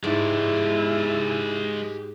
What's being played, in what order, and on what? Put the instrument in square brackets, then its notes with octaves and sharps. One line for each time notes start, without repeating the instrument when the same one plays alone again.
[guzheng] G#2 [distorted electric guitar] G#3 D5 [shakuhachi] E4 [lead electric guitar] G4 F#5